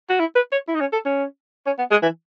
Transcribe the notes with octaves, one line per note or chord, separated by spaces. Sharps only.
F#4
E4
B4
C#5
E4
D#4
C#4
A4
C#4
C#4
B3
G#3
E3